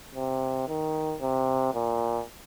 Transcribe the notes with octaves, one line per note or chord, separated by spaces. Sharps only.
C3
D#3
C3
A#2